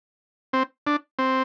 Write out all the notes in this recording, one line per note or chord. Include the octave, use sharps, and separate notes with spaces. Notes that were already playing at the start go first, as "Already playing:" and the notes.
C4
D4
C4